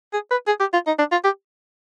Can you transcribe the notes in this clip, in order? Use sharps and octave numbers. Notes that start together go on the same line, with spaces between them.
G#4
B4
G#4
G4
F4
D#4
D4
F4
G4